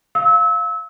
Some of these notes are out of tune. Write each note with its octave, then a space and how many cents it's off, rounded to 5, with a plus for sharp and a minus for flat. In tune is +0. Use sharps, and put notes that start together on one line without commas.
F5 +0 E6 -30